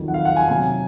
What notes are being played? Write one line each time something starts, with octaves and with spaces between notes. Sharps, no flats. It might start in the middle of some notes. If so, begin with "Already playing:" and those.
Already playing: F2 D#3 F#3
F#5
F5
F#5
G#5
C3 F#3 G#5